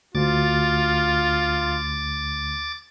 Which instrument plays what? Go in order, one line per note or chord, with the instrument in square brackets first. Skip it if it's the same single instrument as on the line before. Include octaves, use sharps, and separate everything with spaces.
[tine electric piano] D2 [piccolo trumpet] F4 [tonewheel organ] D6 A6